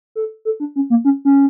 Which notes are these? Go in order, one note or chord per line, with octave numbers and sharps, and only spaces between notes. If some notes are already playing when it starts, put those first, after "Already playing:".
A4
A4
D4
C#4
A#3
C#4
C#4